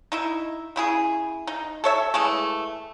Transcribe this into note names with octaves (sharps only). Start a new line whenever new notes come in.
D#4 E4 E5
C#3 E4 G#4
D#4
A4 C#5 E5
E3 G#3 A3